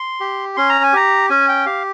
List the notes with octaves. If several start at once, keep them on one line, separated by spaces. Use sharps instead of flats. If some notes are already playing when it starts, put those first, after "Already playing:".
Already playing: C6
G4
C#4 C6
A#5
G#5
G4 A#5
C#4 G#5
G5
G4 F5